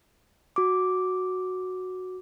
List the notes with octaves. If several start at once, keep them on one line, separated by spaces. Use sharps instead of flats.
F#4 D6